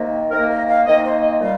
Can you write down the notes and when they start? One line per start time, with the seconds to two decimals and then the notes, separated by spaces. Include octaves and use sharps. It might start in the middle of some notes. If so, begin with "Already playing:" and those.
Already playing: C3 D#3 A#3
0.31 C3 D#3 A#3 A#4
0.49 D#5
0.68 F5
0.85 C3 D#3 A#3 D#5
1.04 C5
1.21 D#5
1.40 A#2 G3 F5